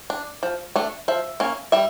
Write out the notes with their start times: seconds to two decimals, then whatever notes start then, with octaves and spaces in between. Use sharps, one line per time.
0.10 D4
0.43 F3
0.76 A3 D4
1.08 F3 E5
1.40 A#3 C#4
1.72 G3 E5